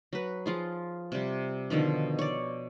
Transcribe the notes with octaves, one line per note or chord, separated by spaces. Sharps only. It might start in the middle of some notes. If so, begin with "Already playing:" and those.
F#3 B4
F3 F4 G#4
C3 G3
B2 D3 D#3 F3
C#5 D5